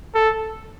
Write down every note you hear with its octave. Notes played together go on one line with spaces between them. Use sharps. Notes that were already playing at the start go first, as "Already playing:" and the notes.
A4